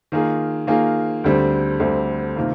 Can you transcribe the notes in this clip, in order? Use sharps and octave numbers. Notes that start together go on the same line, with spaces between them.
D#3 A#3 F4 G#4
D#3 A#3 F4 G#4
D2 D3 G3 C4
D2 D3 G3 C4
C3 D#3 A#3 F4